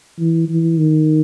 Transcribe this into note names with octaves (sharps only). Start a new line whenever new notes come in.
E3
E3
D#3